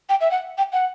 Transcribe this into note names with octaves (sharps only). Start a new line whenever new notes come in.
G5
E5
F#5
G5
F#5